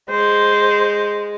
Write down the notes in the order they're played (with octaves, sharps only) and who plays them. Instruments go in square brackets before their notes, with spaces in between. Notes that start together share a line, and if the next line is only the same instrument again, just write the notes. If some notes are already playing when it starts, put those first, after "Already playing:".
[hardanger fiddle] G#3 [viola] C5